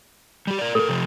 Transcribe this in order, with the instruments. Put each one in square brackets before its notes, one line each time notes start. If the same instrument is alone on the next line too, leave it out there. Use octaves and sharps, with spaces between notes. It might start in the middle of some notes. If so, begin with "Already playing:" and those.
[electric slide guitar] G3 G4
A#4 D5
[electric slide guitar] A2 A#4 [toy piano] A4
[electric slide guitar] C3 F3